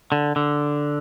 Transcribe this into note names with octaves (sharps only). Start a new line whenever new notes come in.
D3
D3